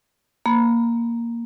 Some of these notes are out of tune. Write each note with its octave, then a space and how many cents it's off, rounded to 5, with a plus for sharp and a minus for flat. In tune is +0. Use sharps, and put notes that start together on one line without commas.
A#3 +0 B5 +0